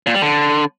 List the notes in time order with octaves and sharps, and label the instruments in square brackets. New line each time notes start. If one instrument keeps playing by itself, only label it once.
[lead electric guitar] A#2
G3
D3